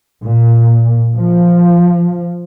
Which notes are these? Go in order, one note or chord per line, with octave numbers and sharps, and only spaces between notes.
A#2
F3